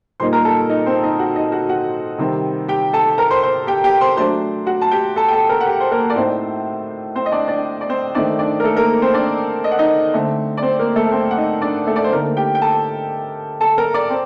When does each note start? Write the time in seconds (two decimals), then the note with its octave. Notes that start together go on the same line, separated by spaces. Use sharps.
0.20 A#2 G3 A#3 D#4 C5 C6
0.33 A#4 A#5
0.45 A4 A5
0.69 D#4 D#5
0.86 C4 C5
1.03 D#4 D#5
1.19 F#4 F#5
1.35 D#4 D#5
1.52 F#4 F#5
1.69 F#4 F#5
2.18 C3 D#3 G3 C4
2.68 G4 G5
2.93 A4 A5
3.18 A#4 A#5
3.30 C5 C6
3.43 C5 C6
3.67 G4 G5
3.84 G4 G5
4.01 C5 C6
4.17 F#3 A3 D4 C5 C6
4.66 F#4 F#5
4.81 A5
4.91 G4 G5
5.16 A4 A5
5.28 G5
5.33 A4 A5
5.49 A#4 A#5
5.61 F#5
5.66 G4 G5
5.80 C5
5.92 A#3 A#4
6.10 D5
6.15 A2 A3 C4 D#4 C5
7.15 C4 C5
7.26 D#5
7.32 D4 D5
7.48 D4 D5
7.81 D5
7.89 C4 C5
8.15 D#3 A3 C4 D4 D#4 D5
8.39 D4 D5
8.60 A#4
8.64 A3 A4
8.76 A#3 A#4
9.02 C4 C5
9.14 D4 D5
9.64 D#5
9.72 F#5
9.79 D#4 D#5
10.14 D3 A3 C4
10.57 D5
10.62 C4 C5
10.79 A#3 A#4
10.96 A3 A4
11.12 C4 C5
11.31 F#5
11.37 D#4 D#5
11.62 D4 D5
11.87 A3 A4
11.96 D5
12.04 C5
12.12 D3 A3 A#3 C4 D#4 A#4
12.37 G4 G5
12.55 G5
12.61 A4 A5
13.61 A4 A5
13.78 A#4 A#5
13.94 D5 D6
14.10 C4